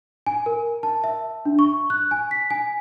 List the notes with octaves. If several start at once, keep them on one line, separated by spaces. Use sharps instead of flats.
G#5
A#4
A5
E5
D4
C#6
F#6
G#5
B6
G#5